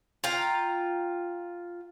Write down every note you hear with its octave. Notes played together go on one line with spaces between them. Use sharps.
F4 F5 G5 A#5